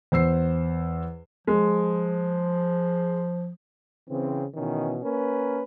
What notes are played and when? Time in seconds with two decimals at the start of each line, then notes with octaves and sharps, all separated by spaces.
0.12 E2 C5 E6 C7
1.47 F3 G#3
4.09 C#3 E3 C4
4.55 B2 D#3 E3 C#4
5.03 A#3 C#4 A#4 B4